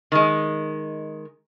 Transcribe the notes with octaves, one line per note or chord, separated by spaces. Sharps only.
D#3 G#3